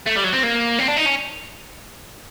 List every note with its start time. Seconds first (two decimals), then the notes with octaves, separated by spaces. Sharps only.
0.06 A3
0.16 G3
0.24 F#3
0.33 C4
0.43 A#3
0.79 C4
0.88 D4
0.97 D#4
1.06 C#4